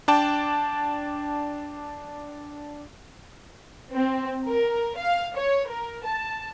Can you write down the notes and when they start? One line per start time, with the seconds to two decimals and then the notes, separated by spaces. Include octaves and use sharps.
0.08 D4 D5 G5 A5
3.94 C4
4.47 A#4
4.98 F5
5.37 C#5
5.69 A#4
6.06 A5